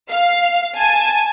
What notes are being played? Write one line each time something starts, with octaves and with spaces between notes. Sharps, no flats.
F5
G#5 A5